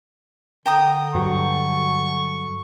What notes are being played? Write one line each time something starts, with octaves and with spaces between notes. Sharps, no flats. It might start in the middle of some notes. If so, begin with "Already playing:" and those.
D3 G5 A#5 D#6
G2 F#3 C#6